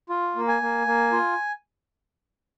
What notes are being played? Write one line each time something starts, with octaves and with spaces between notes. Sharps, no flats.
F4
A#3
G#5
A#3
A#3
F4